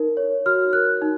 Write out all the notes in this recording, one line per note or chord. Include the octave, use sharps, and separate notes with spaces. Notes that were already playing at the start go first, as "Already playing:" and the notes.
Already playing: D#4 A#4
C#5
F#4 F6
A#4 F#6
D#4